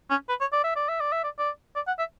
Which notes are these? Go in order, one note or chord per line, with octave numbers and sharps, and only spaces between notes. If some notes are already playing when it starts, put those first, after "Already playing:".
C#4
B4
C#5
D5
E5
D5
E5
D5
E5
D5
D5
D5
F#5
E5